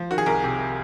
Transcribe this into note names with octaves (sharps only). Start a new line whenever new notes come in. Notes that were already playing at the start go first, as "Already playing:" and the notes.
Already playing: F3
D#3 F#4
G#4
C2 A#4
C3